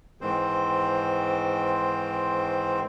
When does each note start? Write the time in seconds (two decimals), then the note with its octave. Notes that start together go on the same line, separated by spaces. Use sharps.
0.21 G#2 D#3 E3 C4 C5